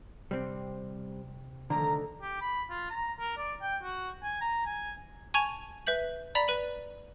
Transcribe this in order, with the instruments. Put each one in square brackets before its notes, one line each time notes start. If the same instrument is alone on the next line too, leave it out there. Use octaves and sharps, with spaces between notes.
[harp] C3 [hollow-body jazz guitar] G3 C4
[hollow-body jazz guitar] D3 [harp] D#3 F3 A3 [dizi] A#5
[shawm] G4
B5
F4
A#5
A#4
D5
G5
F#4
G#5
A#5
G#5
[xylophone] G#5 A5 C#6 G#6 D#7 F7
B4 E5 G6 F#7
D5 A#5 B5 B6
B4 D#7 F#7